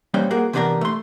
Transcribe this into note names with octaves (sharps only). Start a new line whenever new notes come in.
A#2 G3 A#3 C#4 C5 G5
A#3 F#4 G#4 A#4
C3 E3 B3 D4 G4 A#4
A3 C6